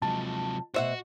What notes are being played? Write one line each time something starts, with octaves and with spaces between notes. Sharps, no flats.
C3 F3 F#3 G#3 A5
B2 A3 F#4 C5 E5 F#5